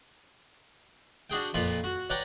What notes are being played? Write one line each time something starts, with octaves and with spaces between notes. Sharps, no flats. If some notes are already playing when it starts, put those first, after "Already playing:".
D4 F#4 G#4 G5
F2 A#2 F4 G#5 B5
F#4
B4 C#5 D5 F#5 G5 A#5